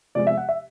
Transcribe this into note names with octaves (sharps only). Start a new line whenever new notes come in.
C3 F3 G#3 B3 D5
E5
F#5
E5